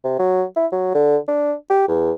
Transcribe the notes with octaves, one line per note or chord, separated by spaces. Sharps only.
C3
F#3
E4
F#3
D3
D4
G4
E2